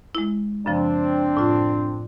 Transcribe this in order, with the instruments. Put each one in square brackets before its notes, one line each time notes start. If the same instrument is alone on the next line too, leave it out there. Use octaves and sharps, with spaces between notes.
[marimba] G#3 E4
[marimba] F#2 C#3 F3 [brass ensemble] C4 D4
[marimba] A2 F4